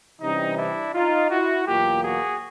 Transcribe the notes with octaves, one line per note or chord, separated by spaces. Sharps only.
C3 E3 G3 C#4 D#4
D4 E4
D#4 F4
E4 F#4
E2 B2 F#3 A#3 F4 G4
F#4 G#4